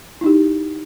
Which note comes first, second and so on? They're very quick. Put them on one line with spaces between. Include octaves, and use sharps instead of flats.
E4 D#4 G4